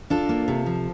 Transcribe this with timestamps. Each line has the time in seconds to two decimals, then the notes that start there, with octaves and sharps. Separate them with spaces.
0.10 D4 F4 A4
0.29 A#3
0.48 C3
0.66 F3